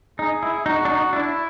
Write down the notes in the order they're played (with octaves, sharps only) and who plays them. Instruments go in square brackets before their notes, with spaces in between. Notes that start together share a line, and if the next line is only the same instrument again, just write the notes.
[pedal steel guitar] D#4 [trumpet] G#4
[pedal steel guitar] E4
[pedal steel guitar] D#4 [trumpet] F#4
[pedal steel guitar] D4
D#4
[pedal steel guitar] D4 [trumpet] E4